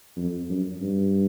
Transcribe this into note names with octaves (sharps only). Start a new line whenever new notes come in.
F2
F#2
G2